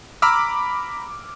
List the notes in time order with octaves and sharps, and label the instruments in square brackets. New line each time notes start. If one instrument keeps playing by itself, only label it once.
[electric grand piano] A#5 B5 D6 E6 F6